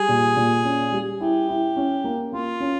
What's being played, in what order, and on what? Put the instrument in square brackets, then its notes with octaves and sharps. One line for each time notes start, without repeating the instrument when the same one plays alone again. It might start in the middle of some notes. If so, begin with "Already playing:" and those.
Already playing: [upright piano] G3 [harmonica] G#4
[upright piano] A#2
A#2
C#4
G3
[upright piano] E4 [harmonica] G4
[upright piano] E4
C#4
A#3
[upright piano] A#3 [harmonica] F4
[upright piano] C#4